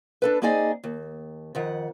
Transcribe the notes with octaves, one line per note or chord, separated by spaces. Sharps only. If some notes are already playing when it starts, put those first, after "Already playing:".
D4 A4 B4
A#3 C4 D#4 G#4 D5 D#5
D#2
F2 D#3 F#5